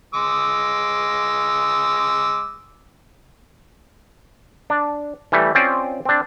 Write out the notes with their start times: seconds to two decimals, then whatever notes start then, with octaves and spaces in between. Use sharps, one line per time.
0.14 G#3 D6 E6
4.70 D4
5.32 E3 G3 A3
5.55 C4 C#4 F4 C5 D5
6.05 C4 D4